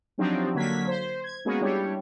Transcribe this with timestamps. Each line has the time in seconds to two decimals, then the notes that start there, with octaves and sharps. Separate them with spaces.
0.18 F3 F#3 C4 D4 D#4 G4
0.55 D3 F#3 A#3 G#6 B6
0.87 C5
1.24 G#6
1.45 G#3 A#3 B3 C#4 F#4 G#4
1.61 G3 D4 E4 G4 C#5